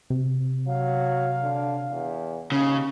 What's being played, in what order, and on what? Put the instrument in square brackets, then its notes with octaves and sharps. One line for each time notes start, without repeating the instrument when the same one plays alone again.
[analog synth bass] C3
[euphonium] F#3 [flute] F5
[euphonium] D3
E2
[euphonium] D#2 [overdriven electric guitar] C#3